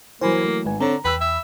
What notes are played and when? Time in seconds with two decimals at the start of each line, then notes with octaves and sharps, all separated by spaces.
0.21 E3 F#3 A#3 C5 G#5 B5
0.45 A3
0.65 G#1 B4 G#5
0.80 D3 C4 D4 C#5 A#5
1.05 E2 B4 G5 B5 E6
1.21 E5